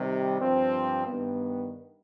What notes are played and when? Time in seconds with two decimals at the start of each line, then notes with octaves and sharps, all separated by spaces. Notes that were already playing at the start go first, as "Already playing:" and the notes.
Already playing: C3 D#3 G3
0.39 G2 F3 C4
1.06 G2 D#3 B3